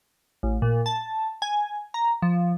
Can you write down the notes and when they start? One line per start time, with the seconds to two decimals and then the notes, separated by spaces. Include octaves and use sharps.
0.43 A1
0.62 A#2
0.86 A5
1.42 G#5
1.94 A#5
2.22 F3